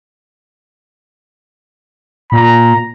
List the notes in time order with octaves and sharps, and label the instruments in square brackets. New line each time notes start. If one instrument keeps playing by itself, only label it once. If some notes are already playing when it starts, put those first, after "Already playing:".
[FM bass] A#2 [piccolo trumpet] A#5